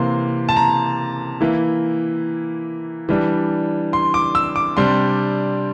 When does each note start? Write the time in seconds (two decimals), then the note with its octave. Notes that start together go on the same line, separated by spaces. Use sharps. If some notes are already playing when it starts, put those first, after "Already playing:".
Already playing: C3 E3 A#3 C6
0.49 A5
0.56 A#5
1.41 E3 A#3 E4
3.09 E3 G3 D4
3.93 C6
4.14 D6
4.35 E6
4.56 D6
4.77 C3 G3 D4 C6